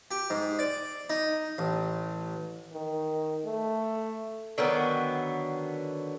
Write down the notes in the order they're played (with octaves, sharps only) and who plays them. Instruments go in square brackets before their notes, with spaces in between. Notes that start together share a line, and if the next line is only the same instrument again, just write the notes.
[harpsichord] G4
G#2
D5
D#4
A1
[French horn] D#3
A3
[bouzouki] D3 D#3 F#3 B3